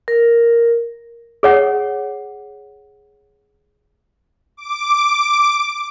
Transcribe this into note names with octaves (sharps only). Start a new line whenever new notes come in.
A#4
G#4 C#5 F#5
D6